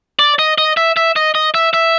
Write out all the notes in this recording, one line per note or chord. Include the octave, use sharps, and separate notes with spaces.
D5
D#5
D#5
E5
E5
D#5
D#5
E5
E5